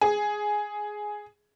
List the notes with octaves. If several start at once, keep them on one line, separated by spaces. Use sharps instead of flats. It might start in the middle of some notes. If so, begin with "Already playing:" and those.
G#4